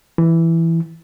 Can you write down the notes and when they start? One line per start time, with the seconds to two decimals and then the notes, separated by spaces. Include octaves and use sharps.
0.18 E3